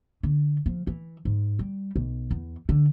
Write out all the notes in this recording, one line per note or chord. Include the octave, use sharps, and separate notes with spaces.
D3
F3
E3
G#2
G3
B1
E2
D3